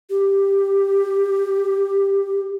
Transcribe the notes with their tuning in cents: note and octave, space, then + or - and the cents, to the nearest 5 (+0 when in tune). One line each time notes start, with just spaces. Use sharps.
G4 +10